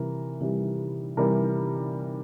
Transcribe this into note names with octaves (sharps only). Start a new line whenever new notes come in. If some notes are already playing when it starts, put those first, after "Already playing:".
Already playing: C3 E3 G3 A#4
C3 E3 G3
C3 E3 G3 A#4